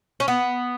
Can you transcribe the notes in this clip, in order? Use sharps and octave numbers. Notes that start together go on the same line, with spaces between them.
C#4
B3